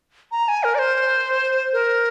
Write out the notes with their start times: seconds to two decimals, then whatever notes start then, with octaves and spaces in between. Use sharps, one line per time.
0.31 A#5
0.48 G#5
0.64 A#4
0.75 D5
0.79 C5
1.73 A#4